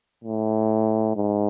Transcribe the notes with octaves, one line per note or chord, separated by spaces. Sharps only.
A2
G#2